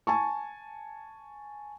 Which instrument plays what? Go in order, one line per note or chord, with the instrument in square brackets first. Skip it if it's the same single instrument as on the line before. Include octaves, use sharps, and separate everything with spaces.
[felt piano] G#5 A5 C#6